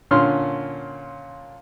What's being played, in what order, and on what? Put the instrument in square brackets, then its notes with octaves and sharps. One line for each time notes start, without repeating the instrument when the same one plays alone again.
[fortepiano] A#2 D3 C#4 C6 F6